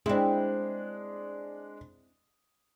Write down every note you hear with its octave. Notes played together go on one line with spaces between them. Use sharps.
G#3 C4 D4 E4